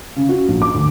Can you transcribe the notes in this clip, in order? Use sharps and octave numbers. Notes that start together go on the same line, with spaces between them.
C#3
F#4
A#1
D6
D2